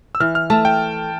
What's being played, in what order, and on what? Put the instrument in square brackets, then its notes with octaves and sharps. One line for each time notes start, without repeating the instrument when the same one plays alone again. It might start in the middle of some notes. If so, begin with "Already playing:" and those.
[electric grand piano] E6
[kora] E3 [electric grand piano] F6
[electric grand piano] F6
[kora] A3 [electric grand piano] A5
[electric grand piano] G5